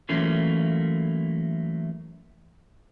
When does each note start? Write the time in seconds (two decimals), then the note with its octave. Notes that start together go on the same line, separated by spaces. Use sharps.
0.09 E3 F#3 A3 A#3 C#4 F4